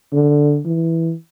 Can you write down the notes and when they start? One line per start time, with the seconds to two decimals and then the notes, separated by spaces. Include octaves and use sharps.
0.13 D3
0.65 E3